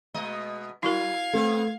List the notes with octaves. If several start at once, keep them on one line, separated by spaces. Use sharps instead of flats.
B2 G#3 D#5
F#3 E4 F#4 A#4 F5 G#6
A3 B3 C4